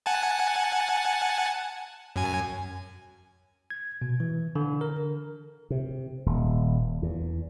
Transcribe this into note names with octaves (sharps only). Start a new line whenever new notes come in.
F#5 G#5 A5
F#2 G#5
G#6
B2
E3
D3
A#4
C3
D#1
E2